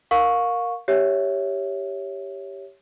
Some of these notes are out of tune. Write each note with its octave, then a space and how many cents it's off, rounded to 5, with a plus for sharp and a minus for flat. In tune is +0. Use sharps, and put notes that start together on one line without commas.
A#4 +0 F5 +30 C#6 +0
G4 +0 C#5 +0 E5 +0